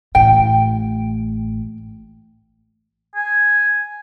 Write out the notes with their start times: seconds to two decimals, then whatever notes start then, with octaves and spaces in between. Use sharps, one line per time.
0.15 A1 A2 G5
3.15 G#5